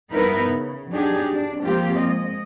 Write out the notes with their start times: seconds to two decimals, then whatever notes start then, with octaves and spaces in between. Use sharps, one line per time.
0.13 G2 B3 D#4 E4 A#4 B4
0.48 C#3
0.92 F#3 D4 D#4 G4 G#4
1.32 D4
1.63 F3 G#3 A#3 C4 F4 G4
2.01 G#3 D#5